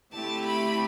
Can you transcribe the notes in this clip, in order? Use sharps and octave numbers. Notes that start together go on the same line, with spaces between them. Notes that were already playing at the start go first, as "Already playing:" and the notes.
D3 A3 C4 E4 G4 A5
B5